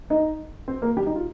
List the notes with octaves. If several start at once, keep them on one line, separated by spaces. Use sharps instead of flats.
D#4 D#5
C4 C5
A#3 A#4
G3 G4
D#4
F4